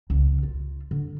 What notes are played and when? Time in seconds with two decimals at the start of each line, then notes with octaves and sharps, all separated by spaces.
0.10 C#2
0.43 F4
0.91 D3